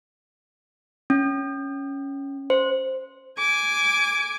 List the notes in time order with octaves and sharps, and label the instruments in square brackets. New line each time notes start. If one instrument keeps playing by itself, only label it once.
[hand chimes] C#4
C5
[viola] G#5 D6